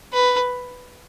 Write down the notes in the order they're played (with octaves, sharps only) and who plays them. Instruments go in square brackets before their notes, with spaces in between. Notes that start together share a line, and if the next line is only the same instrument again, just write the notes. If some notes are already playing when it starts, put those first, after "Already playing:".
[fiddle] B4